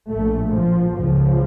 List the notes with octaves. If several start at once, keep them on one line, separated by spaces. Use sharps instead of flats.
A#1 A2 A3
F3
C#2 C#3 F3